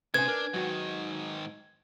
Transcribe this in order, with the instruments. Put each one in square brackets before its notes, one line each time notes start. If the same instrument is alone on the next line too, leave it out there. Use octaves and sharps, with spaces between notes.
[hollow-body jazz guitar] C3 C#4 [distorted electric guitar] D#4 C5 [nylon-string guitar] B4 G#5 [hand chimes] G#6
[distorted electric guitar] D4 [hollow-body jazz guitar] A#4
[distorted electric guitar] G#2 D#3 [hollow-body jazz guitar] F#3 F#4 F#5